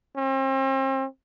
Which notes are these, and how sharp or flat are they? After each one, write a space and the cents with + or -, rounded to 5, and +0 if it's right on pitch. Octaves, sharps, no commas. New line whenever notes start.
C4 +40